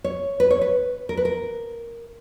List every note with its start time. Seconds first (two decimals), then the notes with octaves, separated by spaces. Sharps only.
0.04 C#5
0.40 B4
0.51 C#5
0.61 B4
1.09 A#4
1.17 B4
1.25 A#4